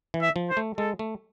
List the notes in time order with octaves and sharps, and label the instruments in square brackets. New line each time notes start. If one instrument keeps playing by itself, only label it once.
[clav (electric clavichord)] E3
[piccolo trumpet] E5
[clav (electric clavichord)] F3
[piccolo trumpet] C5
[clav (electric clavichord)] A3
[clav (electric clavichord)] G#3 [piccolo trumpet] A4
[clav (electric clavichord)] A3